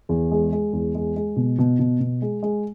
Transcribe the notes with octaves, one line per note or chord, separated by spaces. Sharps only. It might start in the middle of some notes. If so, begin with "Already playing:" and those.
E2
G#3
G#3
E2
G#3
G#3
B2
B2
B2
B2
G#3
G#3